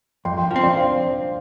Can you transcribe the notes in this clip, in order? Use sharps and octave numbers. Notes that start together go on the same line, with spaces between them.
F2 G5 C6
G5 C6
F3 G5 C6
C4
D5 G5
C5 F5